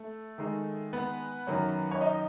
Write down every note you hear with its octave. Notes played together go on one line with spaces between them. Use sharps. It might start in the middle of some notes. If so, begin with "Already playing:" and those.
Already playing: A3 A4
D#3 G#3 D#4
B3 B4
F#2 D#3 F#3 C#4
C#5
D#4 D#5